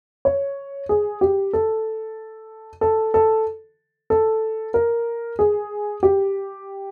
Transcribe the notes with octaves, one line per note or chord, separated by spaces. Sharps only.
C#5
G#4
G4
A4
A4
A4
A4
A#4
G#4
G4